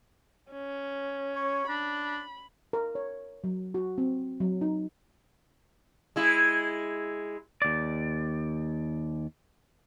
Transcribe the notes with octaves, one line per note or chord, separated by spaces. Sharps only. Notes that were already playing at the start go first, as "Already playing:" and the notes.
C#4
C#5
D4 B5
A#4
C#5
F#3
F#4
C4
F#3
D#4
G#3 E4
D#2 D5